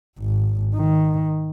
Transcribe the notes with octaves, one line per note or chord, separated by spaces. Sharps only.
G#1
D#3